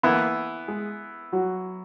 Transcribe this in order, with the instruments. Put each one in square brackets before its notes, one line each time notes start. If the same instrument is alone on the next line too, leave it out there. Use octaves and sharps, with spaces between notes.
[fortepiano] E3 B3 E4 [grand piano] A#3 A#4
[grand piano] G#3 G#4
F#3 F#4